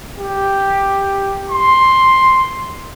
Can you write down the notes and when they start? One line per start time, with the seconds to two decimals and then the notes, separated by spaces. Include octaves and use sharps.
0.18 G4
1.50 C6